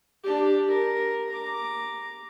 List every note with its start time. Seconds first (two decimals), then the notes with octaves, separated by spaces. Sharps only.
0.23 D4 G4
0.68 A#4
1.29 A#5 D6